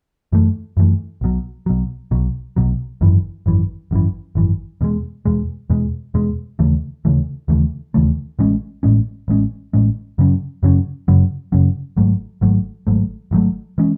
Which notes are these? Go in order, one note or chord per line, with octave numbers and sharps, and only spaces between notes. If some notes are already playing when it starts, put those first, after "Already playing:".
F#2 E3 A3
F#2 E3 A3
B1 B2 F#3
B1 B2 F#3
B1 B2 F#3
B1 B2 F#3
G#1 F#2 E3
G#1 F#2 E3
G#1 F#2 E3
G#1 F#2 E3
E2 B2 G#3
E2 B2 G#3
E2 B2 G#3
E2 B2 G#3
D#2 C#3 E3 A3
D#2 C#3 E3 A3
D#2 C#3 E3 A3
D#2 C#3 E3 A3
A1 A2 G#3 C#4
A1 A2 G#3 C#4
A1 A2 G#3 C#4
A1 A2 G#3 C#4
F#2 C#3 F#3 C#4
F#2 C#3 F#3 C#4
F#2 C#3 F#3 C#4
F#2 C#3 F#3 C#4
G#1 G#2 F#3 A3
G#1 G#2 F#3 A3
G#1 G#2 F#3 A3
G#1 G#2 F#3 A3
E3 G#3 C#4